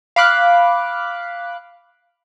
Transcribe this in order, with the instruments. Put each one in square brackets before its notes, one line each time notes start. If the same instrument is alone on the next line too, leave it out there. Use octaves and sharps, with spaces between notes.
[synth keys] F5 B5 D6 F#6